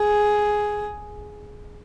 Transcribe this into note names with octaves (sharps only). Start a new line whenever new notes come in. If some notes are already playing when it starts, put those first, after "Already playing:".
Already playing: G#4